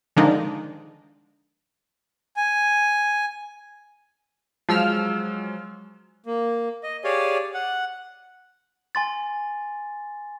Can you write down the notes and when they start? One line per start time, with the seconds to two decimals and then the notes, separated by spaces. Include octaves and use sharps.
0.16 D3 D#3 F3 G#3 D4 D#4
2.37 G#5
4.69 F3 F#3 G#3 E6 F6
6.26 A#3
6.83 D#5
7.04 G4 G#4 C#5 D5 F5 G#5
7.54 F#5
8.95 G#5 C6 A6